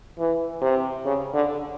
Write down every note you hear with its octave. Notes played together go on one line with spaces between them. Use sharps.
E3
C3
C#3
D3